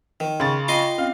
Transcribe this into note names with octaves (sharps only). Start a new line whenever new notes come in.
D#3
C#3 C6 A6
F4 D#5 G5 C6 D6
C4 C#4 F5